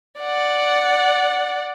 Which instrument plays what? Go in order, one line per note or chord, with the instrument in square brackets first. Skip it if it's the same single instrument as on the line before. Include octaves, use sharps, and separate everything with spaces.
[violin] D5 F#5